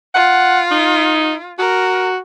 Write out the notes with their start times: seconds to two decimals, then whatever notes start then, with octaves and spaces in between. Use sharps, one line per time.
0.15 F4 F#5
0.71 D#4
1.59 F#4 A#4